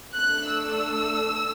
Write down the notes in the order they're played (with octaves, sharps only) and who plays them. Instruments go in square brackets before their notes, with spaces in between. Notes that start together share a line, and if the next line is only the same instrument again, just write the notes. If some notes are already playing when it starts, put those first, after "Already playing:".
[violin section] A3 D4 A4 F#6
E6